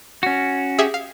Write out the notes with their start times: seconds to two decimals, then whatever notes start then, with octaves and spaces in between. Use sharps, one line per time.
0.23 C#4 F#4
0.79 G4 G#4 E5
0.94 F5